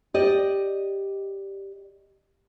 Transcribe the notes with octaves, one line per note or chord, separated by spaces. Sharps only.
G4 D5 D#5